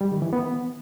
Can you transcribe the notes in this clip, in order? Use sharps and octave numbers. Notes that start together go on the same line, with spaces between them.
G3
D#3
E3
B3